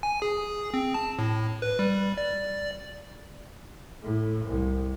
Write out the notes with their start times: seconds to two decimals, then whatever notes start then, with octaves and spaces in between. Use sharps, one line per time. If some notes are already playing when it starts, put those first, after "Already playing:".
0.03 G#5
0.22 G#4
0.74 C4
0.94 A5
1.19 A2
1.62 B4
1.79 G3
2.18 D5
4.03 A2
4.46 C2